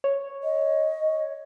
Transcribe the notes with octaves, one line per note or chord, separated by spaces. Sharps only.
C#5
D#5